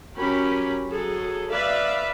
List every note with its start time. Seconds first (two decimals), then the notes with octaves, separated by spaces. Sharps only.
0.16 F#3 C#4 G4 A#4 B5
0.89 F#3 G#4 A4
1.51 B4 D5 E5 F5